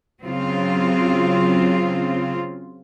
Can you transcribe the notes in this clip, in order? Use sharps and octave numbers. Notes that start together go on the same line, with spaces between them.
C#3 F#3 C4 F4